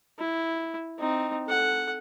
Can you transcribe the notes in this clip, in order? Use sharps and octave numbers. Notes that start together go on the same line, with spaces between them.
E4
C4 D#4
A4 F#5